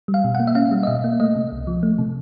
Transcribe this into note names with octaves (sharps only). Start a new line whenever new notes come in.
G3
F5
B2
A#3 F#5
E5
C#4 F5
G3
D#5
B2 E5
A#3
A3 D#5
C3
C2
F3
A3
C3